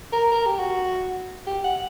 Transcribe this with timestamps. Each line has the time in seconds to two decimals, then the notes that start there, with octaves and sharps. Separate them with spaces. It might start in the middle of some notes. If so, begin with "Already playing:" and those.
0.12 A#4
0.32 A#4
0.46 G4
0.59 F#4
1.47 G4
1.64 F#5